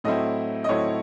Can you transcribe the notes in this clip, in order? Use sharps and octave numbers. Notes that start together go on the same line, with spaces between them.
A2 F#3 A3 C4 E4 D#5
D#5
A2 F#3 A3 C4 E4 C#5